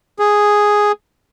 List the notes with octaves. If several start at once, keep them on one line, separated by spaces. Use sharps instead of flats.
G#4